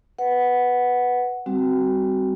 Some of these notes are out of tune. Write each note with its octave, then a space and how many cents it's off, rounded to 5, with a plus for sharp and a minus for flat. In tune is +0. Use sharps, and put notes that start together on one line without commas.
B4 +0 F#5 +0
G3 +15 C4 +0 F#4 +20